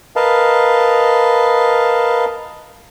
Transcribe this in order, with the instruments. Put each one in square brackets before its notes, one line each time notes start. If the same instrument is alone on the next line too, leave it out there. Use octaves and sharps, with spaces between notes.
[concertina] A#4 B4 D#5 F5 A5